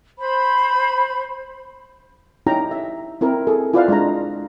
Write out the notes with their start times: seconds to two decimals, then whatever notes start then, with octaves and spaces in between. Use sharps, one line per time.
0.19 C5 B5
2.46 C#4 D#4 E4 G4 G5 A#5
2.71 E5
3.21 C4 E4 A#4
3.47 G#4 A4
3.73 E4 F4 B4 C5 D5 F5
3.88 G#3 D4 A#5